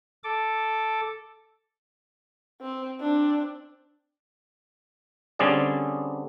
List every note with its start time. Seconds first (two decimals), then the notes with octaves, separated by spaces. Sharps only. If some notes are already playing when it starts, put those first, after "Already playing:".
0.24 A4 D6
2.61 C4
3.00 C4 D4
5.39 D3 G3 C4 C#4 G#4 D5